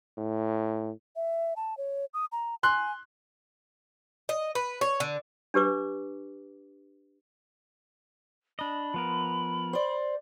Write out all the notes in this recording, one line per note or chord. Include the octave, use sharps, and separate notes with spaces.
A2
E5
A5
C#5
D#6
A#5
G#5 C6 F#6
D#5
B4
C#5
D3
D4 G4 B4 D6
D4 D#5 B5
F3 B3 A#4
C5 D5